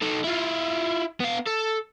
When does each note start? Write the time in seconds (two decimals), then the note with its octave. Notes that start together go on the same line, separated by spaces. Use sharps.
0.02 D#4 A4
0.24 E4 F4
1.20 B3 F5
1.46 A4